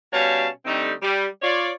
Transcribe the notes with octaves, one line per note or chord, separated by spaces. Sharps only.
B2 G3 C#4 C#5 F5 A5
D3 G3 A3 C4 D#4
G3
F4 C#5 D5